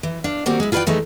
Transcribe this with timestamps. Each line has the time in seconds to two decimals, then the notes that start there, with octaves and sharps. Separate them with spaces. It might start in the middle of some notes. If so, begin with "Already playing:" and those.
0.03 E3
0.24 D4 F5
0.46 D#3 G3 A#3 C4 F#4 D5
0.60 G#3 E4
0.72 F4 G#4 B4 C5 D5 G5
0.87 E3 G#3 A3 D#4